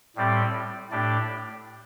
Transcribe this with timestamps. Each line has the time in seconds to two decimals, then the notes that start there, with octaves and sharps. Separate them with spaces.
0.16 A2 G3 C4 G4 D5
0.91 A2 A3 D4 G4 D5